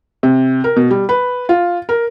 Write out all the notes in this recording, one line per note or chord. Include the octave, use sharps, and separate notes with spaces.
C3
A#4
B2
G3
B4
F4
A#4